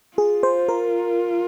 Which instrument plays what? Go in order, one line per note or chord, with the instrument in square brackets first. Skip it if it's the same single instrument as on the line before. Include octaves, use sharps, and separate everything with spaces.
[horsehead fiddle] F4 [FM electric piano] G#4
[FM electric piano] C5
A#4